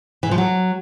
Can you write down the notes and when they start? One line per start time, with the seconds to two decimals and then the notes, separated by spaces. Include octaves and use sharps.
0.23 E3
0.31 F3
0.38 F#3